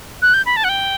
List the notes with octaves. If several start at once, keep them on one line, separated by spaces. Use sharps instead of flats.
F#6
G6
B5
A5
F#5
G5